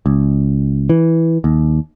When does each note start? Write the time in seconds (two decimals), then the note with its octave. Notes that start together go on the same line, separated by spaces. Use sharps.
0.06 C#2
0.90 E3
1.44 D#2